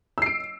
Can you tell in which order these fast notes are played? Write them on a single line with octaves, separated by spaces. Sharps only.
E6 C7 D7